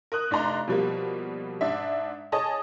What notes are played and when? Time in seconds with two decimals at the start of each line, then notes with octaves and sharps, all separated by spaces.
0.12 A#4 D#6 F#6
0.31 F1 D4 D#4 A#5 C6
0.68 B2 F3 G3 A#3
1.61 G#2 D4 E5
2.32 G#4 C#5 D#5 A5 D#6